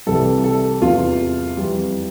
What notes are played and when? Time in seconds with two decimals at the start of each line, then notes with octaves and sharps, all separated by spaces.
0.07 C2 C3 E3 G3 A4
0.44 A4
0.82 E2 C3 E3 F4
1.57 F2 E3 G3